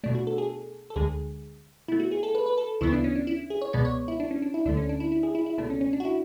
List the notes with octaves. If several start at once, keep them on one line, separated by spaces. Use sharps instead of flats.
B2 A3 D4
F#4
A4
G#4
A4
D2 D3 G#3 G#4
B2 A3 E4
F#4
G#4
A4
B4
B4
A4
D2 C#3 E3 B3 E4
D4
C#4
D4
E4
G#4
C#5
C#2 B2 G#3 B3 D5
C#5
E4
D4
C#4
D4
E4
D2 D3 A3 D4
C#4
D4
E4
E4
G#4
E4
E4
C#2 B2 A3 D4
C#4
C#4
D4
F#4
E4